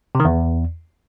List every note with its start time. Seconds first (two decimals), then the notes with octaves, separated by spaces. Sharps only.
0.15 C3
0.20 D#3
0.25 E2